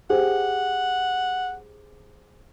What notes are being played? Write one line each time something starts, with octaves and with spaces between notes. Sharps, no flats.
G4 G#4 C5 F#5